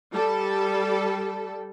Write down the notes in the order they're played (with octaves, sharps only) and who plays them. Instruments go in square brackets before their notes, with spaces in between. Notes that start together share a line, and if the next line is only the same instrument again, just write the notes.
[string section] G3 A4